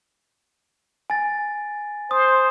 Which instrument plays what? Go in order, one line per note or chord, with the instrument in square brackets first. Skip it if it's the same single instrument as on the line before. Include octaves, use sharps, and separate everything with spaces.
[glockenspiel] G#5 A6
[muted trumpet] C5 [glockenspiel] D#6